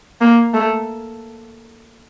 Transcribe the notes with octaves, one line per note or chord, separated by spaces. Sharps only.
A#3
A3